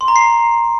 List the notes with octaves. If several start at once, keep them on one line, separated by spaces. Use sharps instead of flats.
C6
A#5
C7